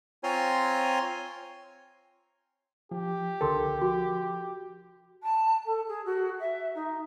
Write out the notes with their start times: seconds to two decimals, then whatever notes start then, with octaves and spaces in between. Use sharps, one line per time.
0.23 C4 F4 C#5 G#5 A#5 C6
2.91 F3 G4
3.41 C2 D3 A4 A#4 C6
3.81 F3 F#4
5.23 A5
5.65 A4
5.88 G#4
6.05 F#4
6.39 E5
6.74 D#4